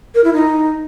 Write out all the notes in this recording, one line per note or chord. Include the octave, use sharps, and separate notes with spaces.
A#4
E4
D#4